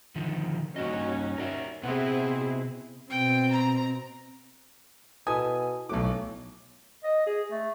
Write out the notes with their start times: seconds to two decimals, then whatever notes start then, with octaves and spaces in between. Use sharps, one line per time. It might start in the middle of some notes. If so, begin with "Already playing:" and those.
0.16 D3 D#3 F3
0.76 G2 A#3 C#4 D#4 F#4 D#5
1.38 A#4 D5 E5
1.83 C3 B3 C4 E4 G#4 F#5
3.10 B2 C4 G5
3.51 A#5
5.27 B2 E4 A4 G#5 A5 D#6
5.89 B1 A2 F#3 A3 F#4 D6
7.04 D#5
7.26 G#4
7.51 A3